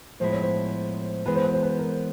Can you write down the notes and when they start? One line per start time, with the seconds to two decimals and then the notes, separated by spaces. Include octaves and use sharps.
0.20 A2 F3 G#3 B3 E4 C5
0.31 C#5
0.42 C5
1.26 E3 G#3 B3 B4
1.35 C5
1.44 B4
1.54 C5
1.63 B4
1.79 A#4